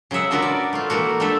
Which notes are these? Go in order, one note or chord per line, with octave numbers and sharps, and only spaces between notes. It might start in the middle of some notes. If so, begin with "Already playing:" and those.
C#3 F#3 D#5 E5 F#5
D4 F4 F#4 A#4 B4 E5
D5
A3 F4
E3 A3 A#3 F#4
G3 A3 D4 F4 A4 E5